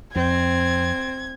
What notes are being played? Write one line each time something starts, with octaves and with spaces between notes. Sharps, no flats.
F2 C4 G#6